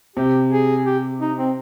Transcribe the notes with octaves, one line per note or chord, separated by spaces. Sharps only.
C3 G4
G#4
G4
D#4
C4